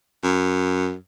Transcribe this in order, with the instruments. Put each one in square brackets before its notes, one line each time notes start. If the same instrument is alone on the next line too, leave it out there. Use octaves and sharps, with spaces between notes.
[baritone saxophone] F#2